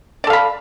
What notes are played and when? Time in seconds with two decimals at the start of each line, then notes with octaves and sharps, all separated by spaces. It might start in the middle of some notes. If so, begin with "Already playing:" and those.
0.24 D5
0.27 A4
0.30 F5
0.33 B5